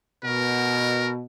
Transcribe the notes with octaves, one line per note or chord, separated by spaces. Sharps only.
B2 A#4